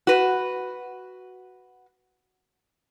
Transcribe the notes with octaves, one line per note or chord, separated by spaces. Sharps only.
F#4 B4